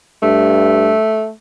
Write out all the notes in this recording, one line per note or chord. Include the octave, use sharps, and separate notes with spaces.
G2 A3